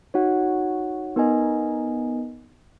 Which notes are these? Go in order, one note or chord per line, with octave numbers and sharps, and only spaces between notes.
D#4 F#4 C#5 F#5
B3 D#4 A#4 D#5 G#5